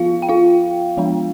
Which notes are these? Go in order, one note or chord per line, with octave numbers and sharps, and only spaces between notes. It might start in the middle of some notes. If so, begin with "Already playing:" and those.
Already playing: F3 B3 F4 F5
G5
F4 F5
F3 G#3 B3 D4